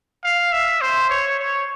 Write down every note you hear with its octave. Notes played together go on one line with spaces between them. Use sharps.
F5
E5
C5
C#5
C#5